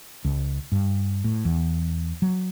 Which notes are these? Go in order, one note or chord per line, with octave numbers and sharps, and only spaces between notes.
C#2
G2
A2
E2
F#3